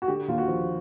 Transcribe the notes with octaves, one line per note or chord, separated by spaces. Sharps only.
F#4
D3 G4
D#2 F4
F#4
F3